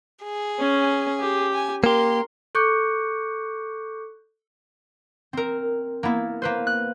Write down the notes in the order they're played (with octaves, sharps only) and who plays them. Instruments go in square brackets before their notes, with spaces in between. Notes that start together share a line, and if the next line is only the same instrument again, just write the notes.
[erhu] G#4
[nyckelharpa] C#4
G4
[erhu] G#5
[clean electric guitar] A#3 G4 [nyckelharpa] A#4 [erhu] C6
[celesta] A4 C#6 D6 F#6 G6 C#7
[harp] C4 A#4
A#3 B3 E4
A#3 B4 C5
F#6